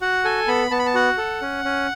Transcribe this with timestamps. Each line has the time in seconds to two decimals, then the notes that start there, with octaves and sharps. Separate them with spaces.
0.01 F#4 F#5
0.24 A4 G#5
0.48 B3 B5
0.71 B3 A5
0.79 B5
0.86 A5
0.94 F#4 F#5
1.18 A4
1.42 C#4
1.65 C#4